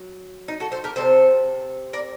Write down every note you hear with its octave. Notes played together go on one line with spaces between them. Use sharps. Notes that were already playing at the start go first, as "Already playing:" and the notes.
Already playing: F#3
D#4
F#4 A4
A4 C5
G4 A#4
C3 G3 C4 A4 C5
A#4 D5